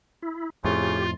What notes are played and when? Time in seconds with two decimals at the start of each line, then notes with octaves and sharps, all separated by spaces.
0.22 E4
0.64 F2 A2 C#3 F4 G4